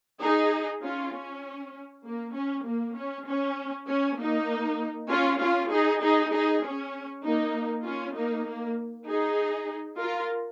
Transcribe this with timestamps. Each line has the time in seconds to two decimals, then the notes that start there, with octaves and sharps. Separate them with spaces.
0.22 D#4 G#4
0.83 C#4 F4
1.13 C#4
2.05 A#3
2.35 C#4
2.67 A#3
2.97 C#4
3.28 C#4
3.88 C#4
4.19 A#3 D#4
5.10 C#4 F4
5.41 C#4 F4
5.72 D#4 G#4
6.02 D#4 G#4
6.33 D#4 G#4
6.63 C#4
7.24 A#3 D#4
7.85 C#4 F4
8.16 A#3 D#4
8.46 A#3
9.08 D#4 G#4
9.99 F4 A#4